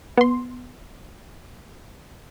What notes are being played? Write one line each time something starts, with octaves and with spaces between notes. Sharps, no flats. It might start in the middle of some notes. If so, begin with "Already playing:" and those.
B3 C6